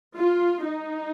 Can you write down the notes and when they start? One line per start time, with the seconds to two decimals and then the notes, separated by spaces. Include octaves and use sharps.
0.16 F4
0.65 D#4